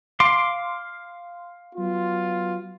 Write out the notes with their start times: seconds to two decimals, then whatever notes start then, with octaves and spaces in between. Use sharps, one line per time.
0.20 F5 C6 D6
1.76 F#3 B3 F4